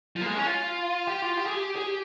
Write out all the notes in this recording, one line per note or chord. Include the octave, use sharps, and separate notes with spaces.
F3
A#3
G#3
C#4
F4
G4
F4
G4
G#4
G4
G#4
G4